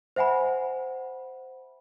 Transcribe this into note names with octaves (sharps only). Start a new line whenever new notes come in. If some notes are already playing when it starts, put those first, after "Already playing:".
C5 E5 F#5 G#5 B5